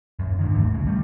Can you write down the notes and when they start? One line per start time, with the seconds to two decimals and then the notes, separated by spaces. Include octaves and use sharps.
0.19 D#1 F#2
0.39 G#2 D3 D#3
0.55 G#1 D#2 E3 A3
0.74 B1 G2 C#3 E3
0.87 G3 A3